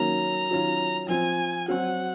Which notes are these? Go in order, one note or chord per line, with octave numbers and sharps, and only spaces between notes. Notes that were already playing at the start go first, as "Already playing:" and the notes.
Already playing: D#3 F#3 A#3 C#4 A#5
D#3 F#3 C#4 F4
F3 C4 F4 G#5
F#3 C4 F#4 F#5